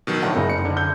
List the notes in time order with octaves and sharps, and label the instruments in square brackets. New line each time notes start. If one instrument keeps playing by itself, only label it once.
[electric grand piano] B2 D#3 F#3
[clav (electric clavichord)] A2 D3 F3 [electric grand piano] F#5
[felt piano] F#1 [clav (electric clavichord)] D#4
[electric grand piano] C#7
[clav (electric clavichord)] D3
[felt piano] G6